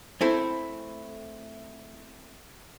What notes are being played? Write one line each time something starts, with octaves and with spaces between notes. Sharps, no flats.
A3 C4 E4 A4